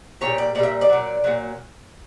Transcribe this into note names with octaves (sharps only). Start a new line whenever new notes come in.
A#2 G3 C#5
D5
A#2 G3 D5 E5
D5
A#2 F#3
A#2 F#3